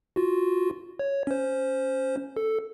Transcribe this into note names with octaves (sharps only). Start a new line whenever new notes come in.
F4 F#4
C#5
C#4 C5
A4